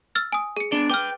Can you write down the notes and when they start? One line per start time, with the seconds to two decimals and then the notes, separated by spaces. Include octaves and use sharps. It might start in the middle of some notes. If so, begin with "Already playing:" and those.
0.15 E6 F6 A6
0.33 G#5 D#6
0.57 G#4 C#7
0.72 B3 D4 D5 G7
0.90 B4 G5 D6 F6